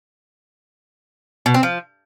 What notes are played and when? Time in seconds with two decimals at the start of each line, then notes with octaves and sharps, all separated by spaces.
1.46 B2
1.54 C4
1.63 F3